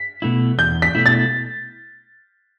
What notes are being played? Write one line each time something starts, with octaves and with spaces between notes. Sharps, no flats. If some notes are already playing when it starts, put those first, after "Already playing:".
Already playing: B6
B2 A3 E4
E2 G6
B6
B2 A3 E4
A6